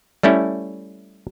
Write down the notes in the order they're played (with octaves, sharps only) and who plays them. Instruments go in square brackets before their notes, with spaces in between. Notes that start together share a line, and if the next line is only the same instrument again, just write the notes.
[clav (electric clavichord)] G3 A3 C#4 E4